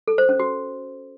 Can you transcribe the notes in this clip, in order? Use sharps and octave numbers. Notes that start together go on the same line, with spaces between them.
A4
C5
C#4
F#4